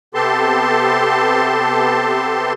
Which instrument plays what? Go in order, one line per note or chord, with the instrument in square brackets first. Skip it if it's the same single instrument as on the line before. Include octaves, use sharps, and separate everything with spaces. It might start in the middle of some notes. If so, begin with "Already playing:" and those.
[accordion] C3 B3 G4 A4 A5 C6